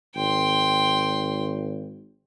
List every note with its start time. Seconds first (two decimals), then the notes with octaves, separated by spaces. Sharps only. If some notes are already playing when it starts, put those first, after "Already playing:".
0.16 G#1 G5 C6